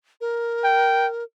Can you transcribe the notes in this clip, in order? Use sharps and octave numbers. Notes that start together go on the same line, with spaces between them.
A#4
G5